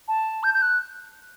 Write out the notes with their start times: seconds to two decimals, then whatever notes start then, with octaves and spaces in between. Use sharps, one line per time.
0.08 A5
0.43 G6
0.54 G6
0.62 F#6